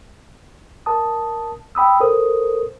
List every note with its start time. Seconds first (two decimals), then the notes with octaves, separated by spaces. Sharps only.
0.86 A#4 A5 D#6
1.75 G5 B5 D#6 E6
2.00 A4 A#4 C5 D#6